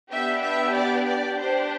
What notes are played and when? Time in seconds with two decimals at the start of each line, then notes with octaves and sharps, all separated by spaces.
0.10 B3 D4 G4 E5
0.43 E5
0.75 D5
1.06 D5
1.38 D4 G4 C5